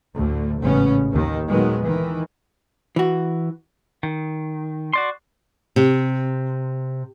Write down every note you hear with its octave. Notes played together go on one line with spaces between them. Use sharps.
D2 A2 D3
A1 G#2 C#3 B3 C#4
D#2 D#3
A#2 D#3 F#3 G#3 B3
D#3 E3
E3 F#4
D#3
F#4 D5 C6
C3